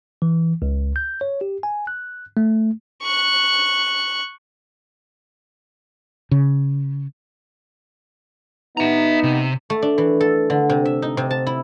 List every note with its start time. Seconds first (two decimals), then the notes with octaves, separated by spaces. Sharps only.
0.22 E3
0.62 C#2
0.96 G6
1.21 C#5
1.41 G4
1.63 G#5
1.87 F#6
2.37 A3
3.03 C#6 F#6
6.31 C#3
8.77 B3 D#4 E5 A#5
9.23 C3
9.70 A3
9.82 D4
9.98 E3
10.20 A4
10.50 D3
10.70 C3
10.85 E5
11.02 D#4
11.17 C3
11.30 A5
11.47 E4